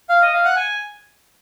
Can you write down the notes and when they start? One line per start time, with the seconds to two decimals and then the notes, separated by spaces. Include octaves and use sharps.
0.09 F5
0.22 D#5
0.34 F5
0.44 F#5
0.56 G#5